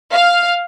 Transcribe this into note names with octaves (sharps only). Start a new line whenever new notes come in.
F5